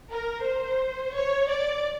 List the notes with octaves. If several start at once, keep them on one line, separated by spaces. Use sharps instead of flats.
A#4
C5
C#5
D5